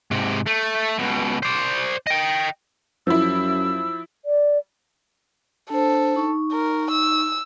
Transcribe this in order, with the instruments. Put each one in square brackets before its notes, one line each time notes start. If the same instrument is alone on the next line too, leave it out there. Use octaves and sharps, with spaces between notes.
[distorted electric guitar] G#2 C3
A3
C#2 B2
C5 D5
D#5 G5
[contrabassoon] F#2 [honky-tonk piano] F3 E4 [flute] E6
[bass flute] D5
[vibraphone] D4 C5 [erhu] A4
[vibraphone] D#4 C#6
[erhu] A#4
E6